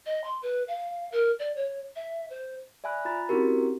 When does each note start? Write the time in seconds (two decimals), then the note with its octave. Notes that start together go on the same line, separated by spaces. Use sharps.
0.06 D#5
0.24 C6
0.42 B4
0.68 F5
1.12 A#4
1.39 D5
1.56 C#5
1.96 E5
2.30 C5
2.84 D5 E5 G#5 B5 F#6
3.05 F4 A#5 B5 A6
3.29 C4 C#4 E4 F#4 G4 A#4